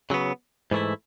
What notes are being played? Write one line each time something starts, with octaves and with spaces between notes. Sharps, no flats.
C#3 F#3 B3
G#2 E3 A3 E4